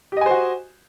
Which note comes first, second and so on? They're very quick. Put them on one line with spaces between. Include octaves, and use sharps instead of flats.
G4 D#5 G#5 C5 F#4